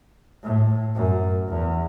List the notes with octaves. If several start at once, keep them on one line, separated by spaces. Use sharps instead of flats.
A2
F#2
E2